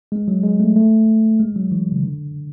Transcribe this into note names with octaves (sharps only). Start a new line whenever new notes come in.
G#3
F#3
G#3
A3
A3
G#3
F#3
E3
C#3
D3